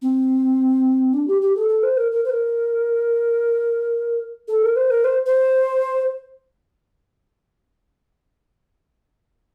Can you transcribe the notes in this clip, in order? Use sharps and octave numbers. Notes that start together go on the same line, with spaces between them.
C4
D4
G4
G4
A4
A4
C5
A#4
A#4
C5
A#4
A4
A#4
C5
A#4
C5
C5